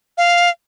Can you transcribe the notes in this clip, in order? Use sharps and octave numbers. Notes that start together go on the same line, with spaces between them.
F5